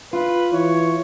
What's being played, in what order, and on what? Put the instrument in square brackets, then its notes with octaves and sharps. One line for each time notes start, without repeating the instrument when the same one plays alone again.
[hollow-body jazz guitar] F4 [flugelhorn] B4
[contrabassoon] E3 [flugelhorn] C#5